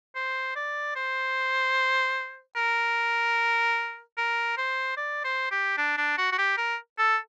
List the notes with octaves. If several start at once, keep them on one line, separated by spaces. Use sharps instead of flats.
C5
D5
C5
A#4
A#4
C5
D5
C5
G4
D4
D4
F#4
F#4
G4
A#4
A4